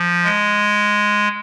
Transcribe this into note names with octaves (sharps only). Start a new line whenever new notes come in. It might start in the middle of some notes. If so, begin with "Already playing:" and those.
Already playing: F3
G#3